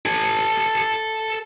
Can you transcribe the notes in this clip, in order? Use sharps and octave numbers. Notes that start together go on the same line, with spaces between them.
A4 G#5